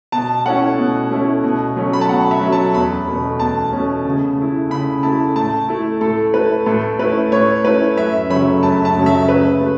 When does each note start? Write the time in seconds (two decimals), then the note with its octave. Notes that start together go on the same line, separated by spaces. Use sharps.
0.12 B2 A5
0.46 A3 C#4 E4 F#5
0.78 B2
1.11 A3 C#4 E4
1.44 B2
1.76 F#3 A3 C#4
1.93 B5
2.01 A5
2.09 B2 F#5
2.31 E5
2.41 F#3 A3 C#4
2.52 A5
2.74 E2 B5
3.07 B2 A3 C#4
3.40 E2 A5
3.73 B2 A3 C#4
4.05 C#3
4.38 A3 E4
4.70 C#3 B5
5.03 A3 E4 A5
5.36 A2 A5
5.69 A3 E4
6.01 A2 A4
6.34 A3 E4 B4
6.66 A2 A4
6.99 A3 C#4 E4 B4
7.32 A2 C#5
7.64 A3 C#4 E4 B4
7.97 F#2 E5
8.30 C#3 F#3 A3 C#4 B5
8.63 F#2 A5
8.85 A5
8.96 C#3 F#3 A3 C#4
9.06 E5
9.29 C#3 B4
9.61 A3